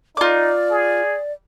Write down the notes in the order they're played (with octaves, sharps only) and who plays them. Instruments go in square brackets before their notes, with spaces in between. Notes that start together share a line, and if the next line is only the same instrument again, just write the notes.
[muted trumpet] D#4 [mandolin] F4 D6 [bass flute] D5
[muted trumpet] G#4